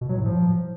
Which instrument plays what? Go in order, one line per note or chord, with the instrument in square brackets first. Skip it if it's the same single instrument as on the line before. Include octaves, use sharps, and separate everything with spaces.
[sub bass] B2
F#3
A2
F3